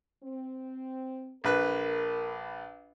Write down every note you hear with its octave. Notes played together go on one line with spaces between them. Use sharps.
C4
A#1 A#4 B4 F#6